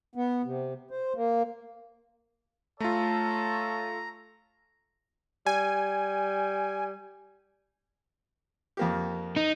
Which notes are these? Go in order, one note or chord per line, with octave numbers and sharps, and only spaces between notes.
B3
C3
C5
A#3
A3 F4 A4 C#5 A#5
G3 G#5
F2 A#3 G4
D#4